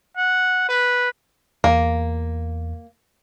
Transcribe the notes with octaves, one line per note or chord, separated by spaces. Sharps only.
F#5
B4
E2 A#3